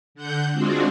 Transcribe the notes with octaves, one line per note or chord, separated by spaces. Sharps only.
D3 F#5 G6
G#3 C4 D4 F4 F#4